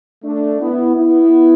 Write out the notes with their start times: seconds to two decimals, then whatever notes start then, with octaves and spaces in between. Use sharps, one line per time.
0.24 A3 D4
0.60 B3 E4
0.95 B3 E4